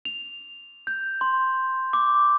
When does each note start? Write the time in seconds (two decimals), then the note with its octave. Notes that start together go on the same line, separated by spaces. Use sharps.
0.05 F7
0.87 G6
1.21 C6
1.93 D6